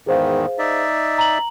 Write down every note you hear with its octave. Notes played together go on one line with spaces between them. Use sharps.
E2 G#2 D#3 G#4 C5 F5
D#4 D5 E5
A#5 F#7